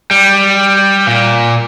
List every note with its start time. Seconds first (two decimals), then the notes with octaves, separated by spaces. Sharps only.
0.11 G3
1.07 A#2